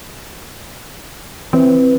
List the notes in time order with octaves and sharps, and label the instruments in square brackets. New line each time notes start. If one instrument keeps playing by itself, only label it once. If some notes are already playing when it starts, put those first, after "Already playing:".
[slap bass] E3 [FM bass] C4